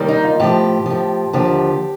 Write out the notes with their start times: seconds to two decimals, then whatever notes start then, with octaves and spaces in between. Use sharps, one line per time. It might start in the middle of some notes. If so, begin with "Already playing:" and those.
Already playing: D#2 D#3 G3
0.08 D#4
0.24 F4
0.40 A2 F3 G4
0.86 A2 F3
1.33 D#2 D3 F3 G4